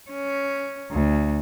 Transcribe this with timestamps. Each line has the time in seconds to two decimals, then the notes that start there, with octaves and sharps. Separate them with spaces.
0.11 C#4
0.91 D2